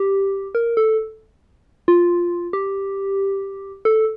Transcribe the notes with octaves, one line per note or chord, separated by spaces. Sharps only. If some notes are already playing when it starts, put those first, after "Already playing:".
Already playing: G4
A#4
A4
F4
G4
A4